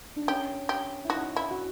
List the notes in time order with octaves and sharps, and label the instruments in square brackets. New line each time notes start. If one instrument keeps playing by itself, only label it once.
[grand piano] D4
[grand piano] C#4 [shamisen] G4
[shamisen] G4
[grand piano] E4
[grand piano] D#4 [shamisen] F#4
[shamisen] E4
[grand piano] F#4